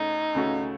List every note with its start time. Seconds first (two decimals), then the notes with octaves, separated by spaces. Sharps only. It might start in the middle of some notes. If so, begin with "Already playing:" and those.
Already playing: C#2 C#3 A3 C#4 D#4
0.34 C#2 C#3 A3 C#4 F#4